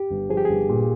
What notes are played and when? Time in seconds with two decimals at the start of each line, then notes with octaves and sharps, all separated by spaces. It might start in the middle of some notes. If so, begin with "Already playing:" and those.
Already playing: G4
0.10 G1
0.29 F3 G#4
0.37 G4
0.45 G1 G#4
0.69 A#2